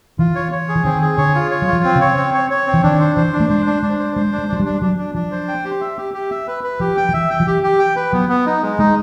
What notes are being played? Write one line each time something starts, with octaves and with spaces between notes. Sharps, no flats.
E3 F4
C#5
C#5
G#4
E3
D#3 C4
G#4
D3 C#5
F4
C#5
F#3
F3 F4
C4
C#3
C#5
C4
C#5
C#5
C4
E3
D#3 D4
C5
E3 C5
D4
A3
G#3 C5
D4
G#3 D4
C5
G#3 C5
D4
G#3
F#3 D4
G3
D4
F#3 D4
D4
F3 D4
C5
G5
G4
E5
G4
G4
E5
B4
B4
F3 G4
G5
F3
E3 E5
G5
F3
E3 G4
G4
G5
B4
F#3 B3
B3
D#4
G#3
G#3 D#4